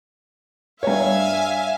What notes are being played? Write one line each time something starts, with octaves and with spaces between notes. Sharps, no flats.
G2 C#5 E5 F5 G#5